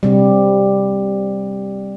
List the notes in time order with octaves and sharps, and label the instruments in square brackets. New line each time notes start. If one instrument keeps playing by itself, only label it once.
[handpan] C3 G3